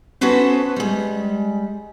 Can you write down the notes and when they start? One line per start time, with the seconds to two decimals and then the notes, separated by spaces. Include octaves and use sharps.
0.21 B3 C#4 F#4 A4 B4 C5
0.76 G3 G#3